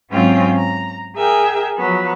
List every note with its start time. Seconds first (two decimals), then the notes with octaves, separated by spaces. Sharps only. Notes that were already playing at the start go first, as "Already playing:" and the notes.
0.10 G#2 F#3 C4 C#4 F4 G5
0.55 A#5
1.16 G#4 A#4 E5 G5
1.77 F3 F#3 B3